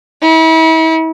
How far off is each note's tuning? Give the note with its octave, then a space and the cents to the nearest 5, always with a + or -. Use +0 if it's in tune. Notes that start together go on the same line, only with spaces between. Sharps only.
E4 -40